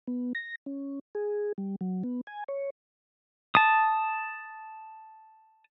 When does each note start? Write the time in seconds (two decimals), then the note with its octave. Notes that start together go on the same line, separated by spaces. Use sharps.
0.08 B3
0.35 A#6
0.66 C#4
1.15 G#4
1.58 G3
1.81 F#3
2.04 B3
2.27 G#5
2.48 C#5
3.55 A5 D#6